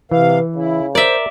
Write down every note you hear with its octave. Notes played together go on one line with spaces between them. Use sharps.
C3 E3 B4 F5
C#3 E4
A#4 C5 D5 E5